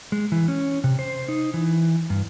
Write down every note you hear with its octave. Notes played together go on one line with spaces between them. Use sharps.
G#3
E3
C#4
C3
C5
D#4
E3
G2